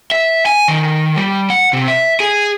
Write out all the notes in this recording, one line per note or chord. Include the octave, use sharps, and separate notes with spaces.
E5
G#5
D#3
G3
F#5
C3
E5
G#4